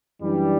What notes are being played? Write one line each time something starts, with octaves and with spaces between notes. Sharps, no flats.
F#2 E3 G3 D4